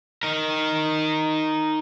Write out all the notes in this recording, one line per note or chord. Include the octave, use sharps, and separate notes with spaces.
D#4 A#4